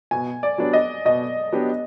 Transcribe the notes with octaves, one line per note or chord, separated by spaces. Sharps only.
B2 G#5
D5
F#3 B3 D4 G4
D#5
B2 D#5
F#3 B3 D4 G4